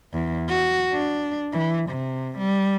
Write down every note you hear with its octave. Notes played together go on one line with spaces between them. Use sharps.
E2
F#4
D4
E3
C3
G3